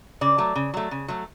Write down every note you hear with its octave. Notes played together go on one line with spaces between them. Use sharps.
C#3 D5
F#3 A3
C#3
F#3 A3
C#3
F#3 A3